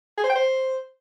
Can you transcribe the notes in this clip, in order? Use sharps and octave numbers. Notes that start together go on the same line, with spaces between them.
G#4
C5
G5
C5